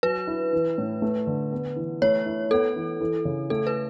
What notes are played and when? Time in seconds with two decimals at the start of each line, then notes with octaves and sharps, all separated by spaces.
0.03 F#3 B4
0.27 E4
0.53 E3
0.78 A2
1.02 A3
1.27 D3
1.52 B3
1.76 E3
2.02 A3 C#5
2.26 E4
2.51 B3 A4
2.76 E3
3.00 E3
3.25 C#3
3.50 A3 A4
3.67 B4